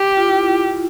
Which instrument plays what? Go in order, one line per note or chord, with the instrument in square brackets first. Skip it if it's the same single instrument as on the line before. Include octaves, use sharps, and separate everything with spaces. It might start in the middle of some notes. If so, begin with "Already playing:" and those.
Already playing: [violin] G4
[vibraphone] F4
E4
E4